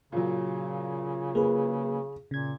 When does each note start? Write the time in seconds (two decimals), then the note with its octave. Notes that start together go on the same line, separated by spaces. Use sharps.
0.12 A#2 C#3 F#3
1.35 A#3 G#4 B4
2.31 A#2 C#3 G#6